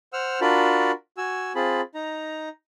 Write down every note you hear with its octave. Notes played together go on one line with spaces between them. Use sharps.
C5 F#5 E6 F6
D4 F4 F#4 A#4 A5 B5
F#4 G#5 E6
C4 F4 G#4 A5 B5
D#4 A#5